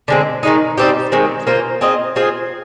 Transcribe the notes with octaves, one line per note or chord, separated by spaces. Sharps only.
D3 G#3 C4
D#3 G#3 D#4
G3 C4 D#4 G4
D#3 G#3 C4
A#3 F4 C5
C4 F4 G#4 D#5
C4 F4 G#4